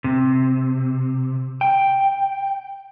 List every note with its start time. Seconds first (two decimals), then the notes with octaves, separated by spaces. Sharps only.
0.04 C3
1.61 G5